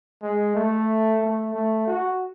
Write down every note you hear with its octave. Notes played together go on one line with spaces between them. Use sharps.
G#3
A3
A3
A3
F#4